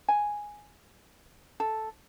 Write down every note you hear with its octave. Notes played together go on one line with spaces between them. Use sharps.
G#5
A4